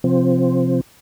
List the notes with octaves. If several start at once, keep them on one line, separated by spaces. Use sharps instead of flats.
C3 F3 C4